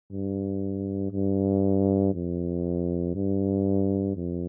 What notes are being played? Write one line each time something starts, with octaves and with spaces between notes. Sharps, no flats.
G2
G2
F2
G2
F2